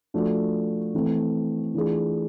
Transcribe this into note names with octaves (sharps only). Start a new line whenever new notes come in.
F3 A3 D4 F#4
E3 A3 C4
E3 A3 D4 F4 G#4